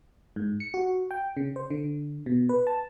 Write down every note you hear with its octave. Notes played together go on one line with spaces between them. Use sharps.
G#2
C#7
F#4
G5
C#3
C5
D3
B2
B4
A5